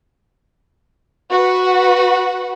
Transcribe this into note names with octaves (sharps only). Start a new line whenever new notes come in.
F#4 B4 F#5